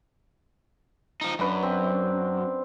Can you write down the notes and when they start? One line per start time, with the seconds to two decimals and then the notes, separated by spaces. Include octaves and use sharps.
1.21 F3 D#4
1.39 F#2 D4 B4
1.63 C4